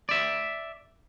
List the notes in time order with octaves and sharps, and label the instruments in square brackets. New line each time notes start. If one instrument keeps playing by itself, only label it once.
[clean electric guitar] D5 E5